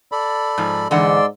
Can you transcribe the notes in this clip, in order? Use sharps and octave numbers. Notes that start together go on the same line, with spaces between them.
A4 D5 B5
G#2 F3
G#2 D3 E3 D5 F#5 C6 E6